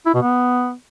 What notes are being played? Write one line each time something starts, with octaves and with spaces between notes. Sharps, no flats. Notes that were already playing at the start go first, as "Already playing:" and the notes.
E4
B2
B3